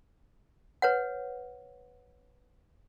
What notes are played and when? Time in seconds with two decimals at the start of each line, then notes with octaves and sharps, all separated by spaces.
0.82 B4 C#5 F#5